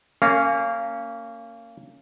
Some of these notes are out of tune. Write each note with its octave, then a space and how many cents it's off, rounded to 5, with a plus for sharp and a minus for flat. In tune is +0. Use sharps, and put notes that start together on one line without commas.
A#3 -25 C#4 +0 F5 +0